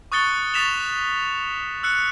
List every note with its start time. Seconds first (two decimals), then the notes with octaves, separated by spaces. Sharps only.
0.12 C#6 D#6 F#6 A6 C#7 G7
0.54 C#6 D#6 A6 B6 E7 F7
1.83 E6 F#6 C#7